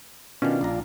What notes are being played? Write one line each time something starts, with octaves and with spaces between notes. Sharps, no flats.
B2 D#3 C#4 D4 F4
A#1 A#5